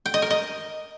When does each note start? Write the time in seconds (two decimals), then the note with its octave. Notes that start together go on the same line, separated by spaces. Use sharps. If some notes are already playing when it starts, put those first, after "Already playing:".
0.06 G5
0.14 D#5
0.22 A#4
0.30 D#5